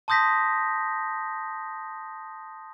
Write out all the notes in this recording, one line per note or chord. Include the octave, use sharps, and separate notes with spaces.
A5 C6 D#6 G6 A#6 B6